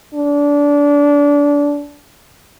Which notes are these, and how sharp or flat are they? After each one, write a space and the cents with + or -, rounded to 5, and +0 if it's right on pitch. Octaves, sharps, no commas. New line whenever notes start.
D4 -25